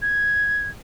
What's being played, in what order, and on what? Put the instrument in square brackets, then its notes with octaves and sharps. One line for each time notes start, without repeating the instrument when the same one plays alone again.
[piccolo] G#6